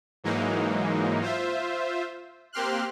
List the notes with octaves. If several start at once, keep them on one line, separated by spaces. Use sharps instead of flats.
G#2 E3 F#3 G#3 A#3 D#4
F4 C5 E5
A#3 C4 G4 C6 F6 F#6